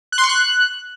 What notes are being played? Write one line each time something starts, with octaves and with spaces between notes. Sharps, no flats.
F#6
C6
C#6
F#6